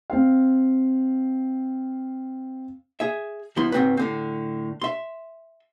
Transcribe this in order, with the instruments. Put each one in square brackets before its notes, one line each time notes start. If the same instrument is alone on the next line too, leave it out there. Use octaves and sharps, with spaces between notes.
[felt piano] C4 F5
[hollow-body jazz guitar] G#4 E5
C#2 F3 B3 E4 C6
C#2 G#2 G#3 C4 F#4 B4
A2 D3 C4
E5 C6